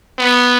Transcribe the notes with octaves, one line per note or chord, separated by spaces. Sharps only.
B3